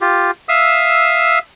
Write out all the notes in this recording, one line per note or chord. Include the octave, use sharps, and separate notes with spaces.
F4 G4
E5 F5 D#6 E6